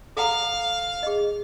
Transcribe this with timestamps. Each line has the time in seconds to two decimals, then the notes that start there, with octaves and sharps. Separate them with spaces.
0.17 A4 F5 F#5 A#5
1.03 G#4 D#5